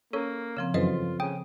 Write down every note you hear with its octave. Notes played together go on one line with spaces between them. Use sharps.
A#3 C#4 A4 C#5
C#3 F3 C4
F#2 E3 F4 A4 B4 C5 D#5
C#3 G5 D#6